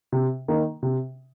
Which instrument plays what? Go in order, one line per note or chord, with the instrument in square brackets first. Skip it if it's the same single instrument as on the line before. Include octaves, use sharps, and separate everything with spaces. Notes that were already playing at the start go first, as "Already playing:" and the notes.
[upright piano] C3
D#3 A#3 D#4
C3